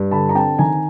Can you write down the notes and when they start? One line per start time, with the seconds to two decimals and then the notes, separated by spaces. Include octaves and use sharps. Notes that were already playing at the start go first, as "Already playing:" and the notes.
Already playing: G2
0.11 D3 A5 B5
0.29 A#5
0.35 C4 G5 A5
0.59 D#3 G#5 A#5